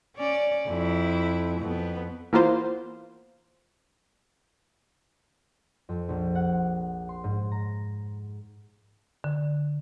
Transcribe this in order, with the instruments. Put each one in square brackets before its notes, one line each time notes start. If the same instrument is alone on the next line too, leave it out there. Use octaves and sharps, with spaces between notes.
[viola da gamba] C#4 D5
F2 E4
F2 B3
[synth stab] E3 A#3 B3 F4 C5
[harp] F2
A#1
F#5
C6
G#2
A#5
[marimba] D3